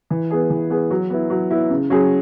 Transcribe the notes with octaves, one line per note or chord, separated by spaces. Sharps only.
E3
B3 G#4
E3
B3 G#4
F#3
B3 E4
F#3
B3 E4
C#3
F#3 C#4 G#4